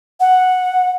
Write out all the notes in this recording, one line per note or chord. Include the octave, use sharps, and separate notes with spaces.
F#5